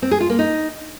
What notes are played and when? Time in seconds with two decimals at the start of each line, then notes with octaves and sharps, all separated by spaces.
0.02 C4
0.11 G#4
0.20 F4
0.30 A#3
0.39 D#4